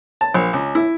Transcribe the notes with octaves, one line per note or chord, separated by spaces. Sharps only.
A5
A#1
C#2
E4